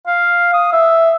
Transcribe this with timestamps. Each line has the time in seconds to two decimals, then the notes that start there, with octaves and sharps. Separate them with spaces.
0.07 F5
0.54 D#6
0.73 E5